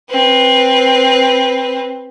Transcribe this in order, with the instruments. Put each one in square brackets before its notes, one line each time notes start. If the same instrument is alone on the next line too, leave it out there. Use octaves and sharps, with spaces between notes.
[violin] C4 B4